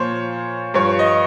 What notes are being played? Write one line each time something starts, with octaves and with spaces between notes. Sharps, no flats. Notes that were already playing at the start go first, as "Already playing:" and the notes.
Already playing: A#2 F3 C5 C#5
G2 F3 C#5
D#5